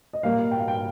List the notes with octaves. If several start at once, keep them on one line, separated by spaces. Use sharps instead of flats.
D#5
A#2 G3 A#3 F5
G5
F5
G5